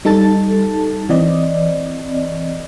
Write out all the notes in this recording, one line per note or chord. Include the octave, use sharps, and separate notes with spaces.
G3 D#4 A4 A5 A6
E3 C4 D5 D#5